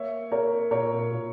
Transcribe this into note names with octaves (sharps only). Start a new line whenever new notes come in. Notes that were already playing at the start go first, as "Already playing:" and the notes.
Already playing: A#3 C#5 E5
A#3 A#4 C#5
A#2 A#4 C#5
A#2